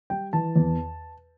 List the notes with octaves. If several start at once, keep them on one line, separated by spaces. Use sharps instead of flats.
G3 G5
E3 A5
E2